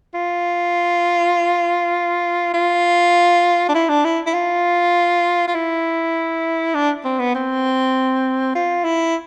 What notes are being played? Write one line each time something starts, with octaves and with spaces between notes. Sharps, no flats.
F4
F4
D4
E4
D4
E4
E4
F4
F4
E4
D4
C4
B3
C4
F4
E4